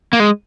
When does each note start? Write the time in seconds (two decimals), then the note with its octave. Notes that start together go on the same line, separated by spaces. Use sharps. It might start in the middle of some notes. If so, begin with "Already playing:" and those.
0.13 A#3
0.20 G#3